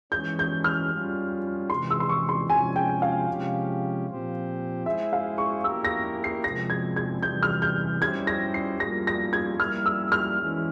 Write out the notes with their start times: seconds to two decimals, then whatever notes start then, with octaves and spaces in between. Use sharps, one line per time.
0.12 E3 G#3 C#4 G6
0.39 G6
0.64 F6
0.91 G3 C#4 F4
1.70 C3 E3 G#3 C6
1.90 E6
2.00 C6
2.09 C#6
2.29 C6
2.49 C3 F3 G#3 C#4 G#5
2.76 G5
3.02 F5
3.28 C3 F3 G#3 C#4 G4
4.07 A#2 F3 C4 G4 C5
4.86 G#3 E4 G#4 C5 E5
5.13 F5
5.38 C#6
5.64 A#3 E4 G4 A#4 E6
5.85 A#6
6.24 C7
6.44 C3 F3 G#3 C4 A#6
6.70 G#6
6.96 G#6
7.23 C3 E3 G3 G6
7.43 F6
7.62 G6
8.01 G3 C#4 E4 G4 C5 G#6
8.27 A#6
8.54 C7
8.80 G3 A#3 F4 A#6
9.07 A#6
9.33 G#6
9.59 G3 A#3 E4 F6
9.86 E6
10.12 F6
10.39 E3 G#3 C#4 E4